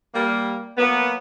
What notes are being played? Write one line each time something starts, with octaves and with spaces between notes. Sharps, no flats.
G3 A#3
F#3 A#3 B3